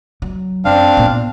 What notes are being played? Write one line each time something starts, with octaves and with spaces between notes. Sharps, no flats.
F#3
F#2 C4 D4 F5
A#2 B3